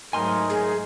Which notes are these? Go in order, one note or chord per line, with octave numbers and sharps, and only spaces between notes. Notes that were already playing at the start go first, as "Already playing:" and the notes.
G#2 F#3 A3 D#4 A#4 G#5 C6 F6
G#4